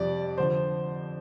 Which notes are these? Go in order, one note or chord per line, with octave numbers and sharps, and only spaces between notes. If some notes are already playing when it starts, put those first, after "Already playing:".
Already playing: F2 C3 G3 D5
D3 F3 C5